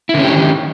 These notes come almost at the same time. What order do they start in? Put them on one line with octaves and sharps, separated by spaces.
E4 D3 C#4 G4 D#3